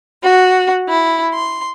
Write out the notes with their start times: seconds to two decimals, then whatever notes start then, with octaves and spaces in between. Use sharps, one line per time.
0.24 F#4
0.88 E4
1.33 C6